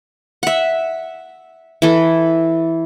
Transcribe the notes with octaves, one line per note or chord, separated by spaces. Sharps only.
E5 F#5
E3 A4